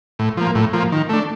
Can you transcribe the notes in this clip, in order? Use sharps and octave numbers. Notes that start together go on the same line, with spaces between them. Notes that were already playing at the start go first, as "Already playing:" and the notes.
A2
F3 A#3
A2
F3 A#3
D#3
A3 D4